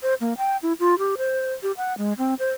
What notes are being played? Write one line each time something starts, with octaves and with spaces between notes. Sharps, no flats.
C5
A#3
G5
E4
F4
G4
C5
G4
F#5
G#3
C4
C5